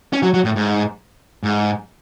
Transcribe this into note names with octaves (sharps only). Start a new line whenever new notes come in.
C#4
F#3
F#3
A2
G#2
G#2